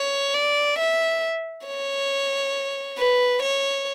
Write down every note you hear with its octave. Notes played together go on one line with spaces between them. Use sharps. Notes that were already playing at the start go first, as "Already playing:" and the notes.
Already playing: C#5
D5
E5
C#5
B4
C#5